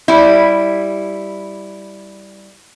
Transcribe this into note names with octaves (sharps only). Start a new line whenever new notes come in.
G3 E4